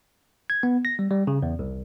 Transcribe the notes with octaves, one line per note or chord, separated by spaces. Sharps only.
G#6
B3
A#6
G3
G3
C#3
E2
C2